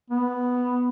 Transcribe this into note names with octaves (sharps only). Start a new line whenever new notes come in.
B3